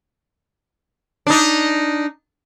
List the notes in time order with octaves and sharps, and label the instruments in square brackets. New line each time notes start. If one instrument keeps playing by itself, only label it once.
[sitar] D4 D#4